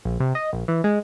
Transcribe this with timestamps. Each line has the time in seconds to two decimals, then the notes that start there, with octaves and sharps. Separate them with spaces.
0.05 A#1
0.20 C3
0.35 D#5
0.53 A#1
0.68 E3
0.84 G#3